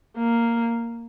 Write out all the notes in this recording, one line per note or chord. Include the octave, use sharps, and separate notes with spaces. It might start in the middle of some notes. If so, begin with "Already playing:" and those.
A#3